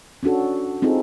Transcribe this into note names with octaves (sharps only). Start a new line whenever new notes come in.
C#4 D4 F#4 A4
C4 D#4 F4 G#4 A4